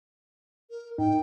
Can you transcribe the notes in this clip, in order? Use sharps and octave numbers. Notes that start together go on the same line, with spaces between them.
A#4
G#2 D#4 G5